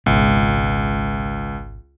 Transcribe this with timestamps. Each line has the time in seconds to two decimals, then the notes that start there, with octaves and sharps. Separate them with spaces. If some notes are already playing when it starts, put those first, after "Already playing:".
0.06 G#1 C#2 B2